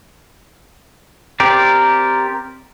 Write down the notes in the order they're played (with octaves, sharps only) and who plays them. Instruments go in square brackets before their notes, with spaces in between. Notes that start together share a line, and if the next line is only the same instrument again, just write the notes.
[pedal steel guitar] C4 G4 A#4 D5